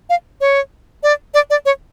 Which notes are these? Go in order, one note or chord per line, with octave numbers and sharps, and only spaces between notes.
F5
C#5
D5
D5
D5
C#5